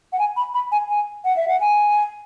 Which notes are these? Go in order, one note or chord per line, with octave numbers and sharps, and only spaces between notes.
F#5
G#5
B5
B5
G#5
G#5
F#5
E5
F#5
G#5